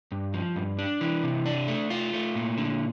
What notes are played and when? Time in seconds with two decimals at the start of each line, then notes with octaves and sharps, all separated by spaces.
0.12 G2
0.34 F3
0.56 G2
0.78 D4
1.01 E3
1.23 C3
1.46 D4
1.68 A3
1.90 F4
2.13 A3
2.35 A#2
2.58 D3